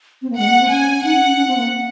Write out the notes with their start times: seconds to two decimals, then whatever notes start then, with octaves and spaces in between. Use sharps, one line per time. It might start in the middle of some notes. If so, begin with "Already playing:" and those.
0.22 C4
0.30 A#3
0.39 G#3 F#5
0.50 A#3
0.61 C4
0.71 C#4 G#5
1.04 D#4 F#5
1.15 C#4
1.25 C#4
1.37 C#4
1.47 C4
1.57 A#3